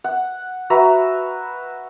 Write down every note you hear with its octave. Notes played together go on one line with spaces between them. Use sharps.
F#5
F#4 B4 E5 A#5